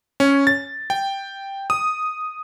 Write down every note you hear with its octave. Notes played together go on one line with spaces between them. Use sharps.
C#4
A6
G5
D#6